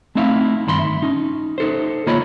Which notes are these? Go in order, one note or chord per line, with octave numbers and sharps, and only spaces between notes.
A3 C4 D#4 E4 E5 F5
G2 D#3 B5 C6
E5
C#4 D#4
D#4 A4 C5
D2 A#3 F4 C#5 D#5 B5